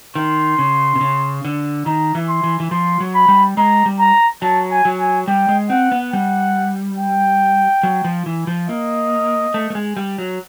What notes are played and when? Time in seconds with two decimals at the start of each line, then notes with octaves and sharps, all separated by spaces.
0.15 D#3 C6
0.59 C#3
0.95 C3
1.01 C#3
1.45 D3
1.86 D#3 A#5
2.15 E3
2.29 C6
2.43 E3
2.60 E3
2.71 F3 C6
3.00 F#3
3.15 B5
3.28 G3
3.57 G#3 A#5
3.86 G3
4.00 A#5
4.42 F#3 A5
4.71 G#5
4.85 F#3
4.99 G#5
5.28 G3 G5
5.49 G#3
5.70 C4 F#5
5.92 B3
6.13 G3 F#5
6.98 G5
7.83 F#3
8.04 F3
8.26 E3
8.47 F3
8.68 A#3 D#5
9.54 A3
9.70 A3
9.75 G#3
9.97 G3
10.18 F#3